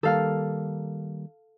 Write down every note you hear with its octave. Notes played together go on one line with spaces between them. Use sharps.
D#3 G3 A#3 A4 F5